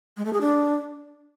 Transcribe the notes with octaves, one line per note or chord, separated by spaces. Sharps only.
G#3
A3
G#4
D4